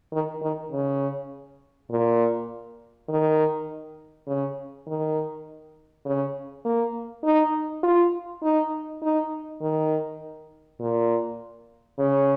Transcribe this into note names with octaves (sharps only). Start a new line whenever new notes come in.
D#3
D#3
C#3
A#2
D#3
C#3
D#3
C#3
A#3
D#4
F4
D#4
D#4
D#3
A#2
C#3